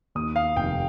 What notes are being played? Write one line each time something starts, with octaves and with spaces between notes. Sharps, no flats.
D#2 D#6
F5
F1 G5